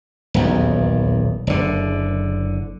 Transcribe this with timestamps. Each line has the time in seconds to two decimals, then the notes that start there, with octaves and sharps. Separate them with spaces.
0.34 D#1 B1 E2
1.47 F#1 D3